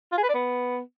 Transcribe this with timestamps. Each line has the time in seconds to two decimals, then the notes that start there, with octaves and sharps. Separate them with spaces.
0.12 F4
0.18 G#4
0.23 B4
0.29 D5
0.34 B3